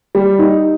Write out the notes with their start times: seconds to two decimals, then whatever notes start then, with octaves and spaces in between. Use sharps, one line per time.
0.15 G3
0.39 D#4